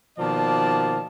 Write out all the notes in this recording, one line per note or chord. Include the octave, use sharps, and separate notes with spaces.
B2 D#3 F3 A#3 D5 A5